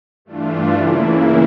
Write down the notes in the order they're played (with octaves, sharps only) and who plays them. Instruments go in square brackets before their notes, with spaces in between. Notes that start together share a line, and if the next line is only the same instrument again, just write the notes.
[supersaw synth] G2 E3 A3 D4 F4
C#3 E3 A#3 E4